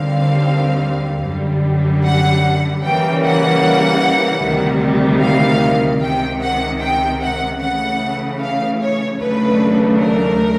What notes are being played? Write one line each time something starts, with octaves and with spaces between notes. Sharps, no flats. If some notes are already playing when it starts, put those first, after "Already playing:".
Already playing: D#2 D3 G3 C4 F5
F#2 D3 G3
F#5
C#3 E3 G3 A#3 C#4 G5
F#5
D2 C3 D#3 G3
F5
C#2 C3 D#3 G5
F#5
G5
F#5
C#3 E3 A3 F#5
F5
C#5
D#2 C#3 F#3 A3 D4 B4
A#4